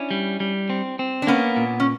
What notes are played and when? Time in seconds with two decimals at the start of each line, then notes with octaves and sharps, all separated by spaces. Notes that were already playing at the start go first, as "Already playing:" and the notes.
Already playing: C#4 D4 E4
0.11 G3
0.40 G3
0.70 C4
0.99 C4
1.22 D4
1.27 A#3 B3 C#4
1.56 A#2
1.80 C#4